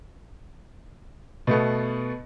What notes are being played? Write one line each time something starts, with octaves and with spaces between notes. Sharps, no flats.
B2 A3 B3